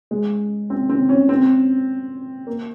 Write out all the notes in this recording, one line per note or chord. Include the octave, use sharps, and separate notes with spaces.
G#3
C4
C4
C#4
C4
A#3